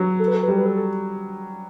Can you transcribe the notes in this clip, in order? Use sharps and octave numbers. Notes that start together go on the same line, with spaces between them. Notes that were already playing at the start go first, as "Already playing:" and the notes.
Already playing: F#3
A4
B4
A4
B4
G3 A4
B4
A4
A4